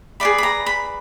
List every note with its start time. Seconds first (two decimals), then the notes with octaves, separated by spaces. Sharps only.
0.20 G#4 B4 D5 B5
0.38 B5
0.43 A#5
0.66 B5